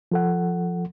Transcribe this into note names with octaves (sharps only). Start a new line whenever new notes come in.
F3 A4 F#5